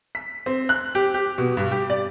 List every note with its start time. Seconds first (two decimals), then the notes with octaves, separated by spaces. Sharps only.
0.15 B6
0.46 C4
0.69 F#6
0.95 G4
1.14 G4
1.38 B2
1.57 G2
1.71 G4
1.90 D5